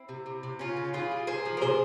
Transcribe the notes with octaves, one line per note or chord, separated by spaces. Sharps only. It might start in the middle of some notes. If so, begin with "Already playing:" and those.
Already playing: C4 E4
C3
C3
C3
C#3 C#4 F4
C#3
E3 F4 G#4
G3
C3 G#4 C5
F3
A#4
C3 G#4 C5